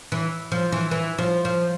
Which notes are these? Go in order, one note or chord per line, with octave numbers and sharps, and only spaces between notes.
E3
F3
E3
E3
F3
F3